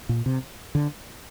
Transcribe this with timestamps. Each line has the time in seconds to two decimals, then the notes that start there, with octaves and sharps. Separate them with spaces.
0.09 A#2
0.26 C3
0.75 D3